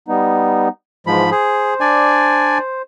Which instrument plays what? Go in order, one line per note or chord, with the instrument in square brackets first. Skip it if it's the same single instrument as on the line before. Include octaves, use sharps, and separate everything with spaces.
[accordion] G3 B3 D#4
[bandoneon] G#2 F3 B5 [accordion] E3 G#3
[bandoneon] G#4 [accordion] C5
[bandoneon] D4 D5 G#5